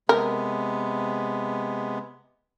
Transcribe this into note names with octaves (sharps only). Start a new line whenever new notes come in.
C3 G#3 B3 A#4